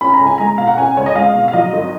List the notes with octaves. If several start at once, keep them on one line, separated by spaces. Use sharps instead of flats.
C#4 B5
A#5
C#2
G#5
G#3 A#5
B2 F5
F#5
C#4 G#5
C#2 C#5
D#5
G#3 F5
B2
F5
F#3 D#5
G#1